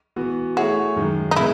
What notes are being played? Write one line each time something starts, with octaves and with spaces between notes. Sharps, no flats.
E3 B3 F#4
A3 E4 F#4 G#4 C#5 E5
F#2 D#3 G#3
D#4
C#3 G#3 B3 E4